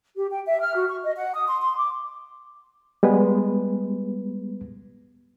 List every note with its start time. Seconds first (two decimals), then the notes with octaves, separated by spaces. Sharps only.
0.16 G4
0.31 G5
0.46 E5
0.60 F6
0.75 F#4
0.89 C#6
1.03 D#5
1.16 F#5
1.34 D#6
1.47 C6
1.62 C6
1.78 D6
3.03 G3 G#3 B3 B4